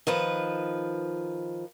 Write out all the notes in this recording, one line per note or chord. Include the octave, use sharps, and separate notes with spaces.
D#3 F3 B4